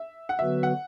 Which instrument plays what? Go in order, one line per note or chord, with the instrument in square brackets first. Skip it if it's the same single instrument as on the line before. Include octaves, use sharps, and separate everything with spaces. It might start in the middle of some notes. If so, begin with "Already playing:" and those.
Already playing: [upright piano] E5
F#5
[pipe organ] D3 F#3 B3 F#4 B4 [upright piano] E5
[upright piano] F#5